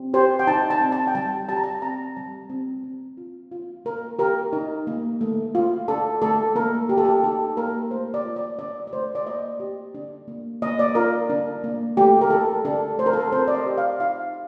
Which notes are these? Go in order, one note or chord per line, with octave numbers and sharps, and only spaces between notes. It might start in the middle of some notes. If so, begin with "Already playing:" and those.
Already playing: C4
G4 C5
G5
D#4 A5
A5
C4
A5
G5
G3 A5
G4 A5
A#5
A5
C4 A#5
G3 A5
C4
C4
F4
F4
A#3 A#4
G4 A#4
D#4
A#3
A3
F4
D4 A4
A3 A4
A#3 A#4
G4
A4
G4
D#4 A4
A#3 A#4
A3 C5
D5
F4
D5
D4 D5
D5
A3 C5
D5
A#3 D#5
G4
D4
A#3
A#3 D#5
D5
F4 A#4
D4
A#3
A3 G4
A#4
G4 A4
D4 A4
A3 C5
A#4
A4
A#4
C4 C5
D5
D#5
G4
F5
D#4 F5